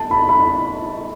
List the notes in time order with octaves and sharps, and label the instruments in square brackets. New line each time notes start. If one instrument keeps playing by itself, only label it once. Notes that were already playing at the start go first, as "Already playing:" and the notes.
Already playing: [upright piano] A5
B5
B5